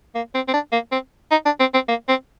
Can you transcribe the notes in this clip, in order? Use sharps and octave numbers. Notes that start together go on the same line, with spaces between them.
A#3
C4
C4
D4
A#3
C4
D#4
D4
C4
C4
A#3
C4